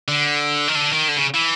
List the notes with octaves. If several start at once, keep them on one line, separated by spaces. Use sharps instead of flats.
D3
D#3
D3
D#3
D3
C#3
E3